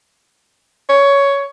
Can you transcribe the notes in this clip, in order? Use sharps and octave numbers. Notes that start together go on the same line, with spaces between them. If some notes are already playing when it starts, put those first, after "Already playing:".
C#5